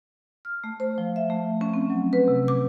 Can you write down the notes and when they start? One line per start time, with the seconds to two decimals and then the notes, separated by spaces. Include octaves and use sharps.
0.45 F6
0.64 A3
0.80 C5
0.98 F3
1.16 E5
1.30 A3
1.61 C#4
1.74 C4
1.90 F#3
2.13 B4
2.28 C3
2.48 D6